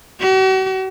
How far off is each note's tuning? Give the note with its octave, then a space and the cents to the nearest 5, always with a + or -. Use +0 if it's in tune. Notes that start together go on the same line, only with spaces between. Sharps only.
F#4 +45